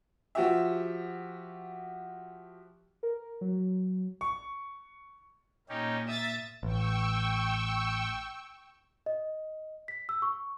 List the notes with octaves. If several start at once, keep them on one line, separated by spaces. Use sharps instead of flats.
F3 F#4 G4 E5
A#4
F#3
C#6
A#2 A#3 C#4 D#4 G4
E5 D#6 A6
A1 G5 C#6 E6
D#5
B6
E6
C#6